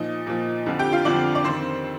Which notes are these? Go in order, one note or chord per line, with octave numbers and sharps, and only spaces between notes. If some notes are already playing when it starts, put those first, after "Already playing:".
Already playing: A#2 F3 D#4 D#5
A#2 F3
F2 D3 F3
G4 G5
F4 F5
F2 D3 F3 D4 D5
D5
F2 D#3 C4 C5